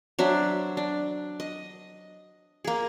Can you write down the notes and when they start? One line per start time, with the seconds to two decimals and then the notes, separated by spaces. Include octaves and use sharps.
0.19 F#3 D4 C5 E5
0.77 D4
1.40 D#5
2.64 A#3 G#4